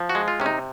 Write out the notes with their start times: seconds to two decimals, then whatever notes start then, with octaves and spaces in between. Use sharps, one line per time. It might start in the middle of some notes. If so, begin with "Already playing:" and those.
Already playing: F3
0.09 F#4
0.15 G#3
0.28 F4
0.40 C3 C#4
0.46 D#4